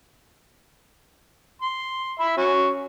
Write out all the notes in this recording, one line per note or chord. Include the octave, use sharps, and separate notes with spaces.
C6
E5 B5
C#4 F#4